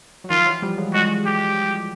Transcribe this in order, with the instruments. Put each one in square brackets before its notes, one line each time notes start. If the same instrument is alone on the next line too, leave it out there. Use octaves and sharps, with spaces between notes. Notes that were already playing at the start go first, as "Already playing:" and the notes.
[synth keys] F#3
[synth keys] D#3 F3 [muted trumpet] F4
[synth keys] E3 F#3
F3 G3
F#3 G#3
[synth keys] F#3 G#3 [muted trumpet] F#4
[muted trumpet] G4